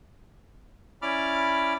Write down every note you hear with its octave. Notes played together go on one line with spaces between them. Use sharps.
C#4 E4 D5 B5 D6 F6